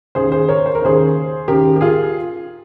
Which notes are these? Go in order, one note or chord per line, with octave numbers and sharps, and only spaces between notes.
D#2 C#3 G#4 C5
G#4 C5
A#4 C#5
C5
A#4
D#2 C#3 G#4 C5
D#2 C#3 G4 A#4
G4
F4 G#4